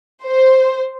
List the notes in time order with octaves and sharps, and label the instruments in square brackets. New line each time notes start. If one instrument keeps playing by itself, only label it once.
[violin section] C5